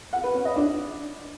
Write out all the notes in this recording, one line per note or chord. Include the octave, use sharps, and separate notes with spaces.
F#5
B4
C#4
D#5
D4